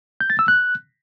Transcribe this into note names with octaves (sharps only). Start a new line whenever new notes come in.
G6
A6
E6
F#6